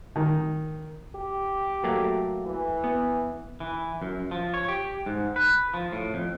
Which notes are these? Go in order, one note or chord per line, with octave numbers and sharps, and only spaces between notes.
D#3
G4
F#3 A3 A#3
E3
B3
E3
F#2
F3
C#5
G4
G#2
B4
F3
A2
F2